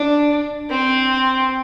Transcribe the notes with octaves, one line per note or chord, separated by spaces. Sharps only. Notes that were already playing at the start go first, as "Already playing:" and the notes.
Already playing: D4
C4